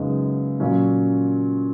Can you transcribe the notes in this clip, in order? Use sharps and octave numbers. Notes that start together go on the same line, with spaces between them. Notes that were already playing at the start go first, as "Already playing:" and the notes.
Already playing: F#2 C#3 G#3 B3 D#4
A#2 F#3 C#4